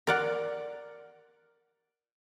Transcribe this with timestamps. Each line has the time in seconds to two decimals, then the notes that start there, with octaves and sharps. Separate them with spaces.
0.07 A#4 D5 F#5